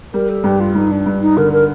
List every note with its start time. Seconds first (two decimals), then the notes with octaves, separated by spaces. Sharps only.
0.13 G3 A#4
0.29 A4
0.44 G2 G4
0.60 F4
0.75 G2 D#4
0.91 D4
1.06 G2
1.21 D#4
1.37 D3 A#4
1.53 A#4